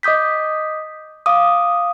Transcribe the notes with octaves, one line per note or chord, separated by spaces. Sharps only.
D#5 D6 D#6 G6 B6
F5 D6 D#6